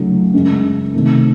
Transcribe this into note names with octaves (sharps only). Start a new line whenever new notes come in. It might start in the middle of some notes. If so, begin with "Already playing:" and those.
Already playing: C#2 C#3 F#3 A3 D#4
F#2 C#3 G#3
C3 D#3 A3